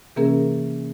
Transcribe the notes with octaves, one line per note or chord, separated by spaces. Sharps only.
C3 E3 A#3 C#4 G#4 A#4